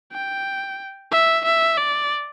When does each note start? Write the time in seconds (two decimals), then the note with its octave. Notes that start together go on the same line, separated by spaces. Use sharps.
0.13 G5
1.12 E5
1.45 E5
1.78 D5